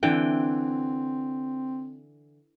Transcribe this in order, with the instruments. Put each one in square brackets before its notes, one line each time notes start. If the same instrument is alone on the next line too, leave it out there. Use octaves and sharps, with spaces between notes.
[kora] D3 E3 G5 [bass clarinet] C4